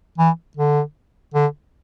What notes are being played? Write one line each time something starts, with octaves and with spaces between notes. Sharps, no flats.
E3
D3
D3